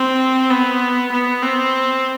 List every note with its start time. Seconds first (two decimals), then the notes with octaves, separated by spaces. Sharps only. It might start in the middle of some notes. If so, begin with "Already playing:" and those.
Already playing: C4
0.50 B3
1.12 B3
1.42 C4